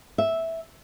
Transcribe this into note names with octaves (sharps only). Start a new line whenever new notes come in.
E5